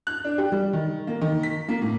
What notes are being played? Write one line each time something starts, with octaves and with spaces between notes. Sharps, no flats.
F#6
D4
G4
G3
D#3
A#3
D#3
B6
A#3
A2